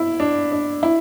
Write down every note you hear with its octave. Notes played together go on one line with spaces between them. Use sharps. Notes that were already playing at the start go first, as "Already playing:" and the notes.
Already playing: E4
D4
D4
E4